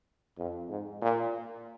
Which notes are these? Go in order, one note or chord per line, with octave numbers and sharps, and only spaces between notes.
F2
G#2
A#2